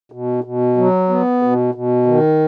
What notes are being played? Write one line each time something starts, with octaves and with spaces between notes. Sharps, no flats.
B2
B2
F#3
B3
B2
B2
D#3